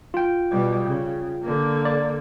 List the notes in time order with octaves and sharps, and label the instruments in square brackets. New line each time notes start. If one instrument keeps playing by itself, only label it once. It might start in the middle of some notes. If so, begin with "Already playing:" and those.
[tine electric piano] F4 G5
[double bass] B2 G3
C#3
D3 A#3
[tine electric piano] D5